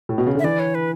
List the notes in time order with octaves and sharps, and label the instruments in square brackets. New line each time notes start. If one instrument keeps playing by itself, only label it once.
[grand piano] A2
B2
C#3
D3
[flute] E5
[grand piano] E3 [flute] D5
[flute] C#5
B4